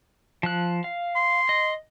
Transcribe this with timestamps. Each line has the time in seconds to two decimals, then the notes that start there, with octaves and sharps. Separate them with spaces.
0.43 F3 F#6
0.84 F5
1.16 C6
1.49 D#5